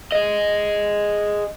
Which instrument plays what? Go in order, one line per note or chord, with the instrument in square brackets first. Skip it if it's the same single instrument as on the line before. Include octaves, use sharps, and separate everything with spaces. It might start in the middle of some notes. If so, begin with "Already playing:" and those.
[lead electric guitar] G#4 D#5